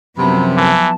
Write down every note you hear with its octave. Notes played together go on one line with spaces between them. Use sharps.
F#2 C3 F3 F#3 B3 B5
E3 A5